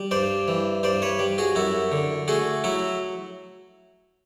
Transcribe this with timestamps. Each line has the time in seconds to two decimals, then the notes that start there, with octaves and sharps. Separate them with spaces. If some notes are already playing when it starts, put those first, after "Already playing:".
Already playing: G3
0.11 G2 C5 D5
0.48 E3
0.83 G2 C5 D5
1.02 B4 C#5
1.19 G3
1.38 F#4 G#4
1.55 F#2 E4 F#4
1.92 D3
2.28 A3 F#4 G#4
2.64 F#3 E4 F#4